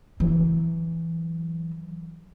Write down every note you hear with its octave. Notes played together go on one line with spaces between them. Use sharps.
E3 F#3